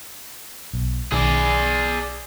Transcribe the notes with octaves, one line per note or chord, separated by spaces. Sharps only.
B1
B1 D#3 G#4 D5